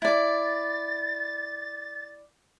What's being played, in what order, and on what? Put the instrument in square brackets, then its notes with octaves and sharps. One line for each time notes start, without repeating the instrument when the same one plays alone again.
[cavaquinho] E4 D5 [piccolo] A6